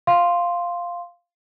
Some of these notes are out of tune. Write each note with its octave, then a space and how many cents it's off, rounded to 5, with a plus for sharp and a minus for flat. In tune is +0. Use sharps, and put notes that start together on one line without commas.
F5 +0 C6 +0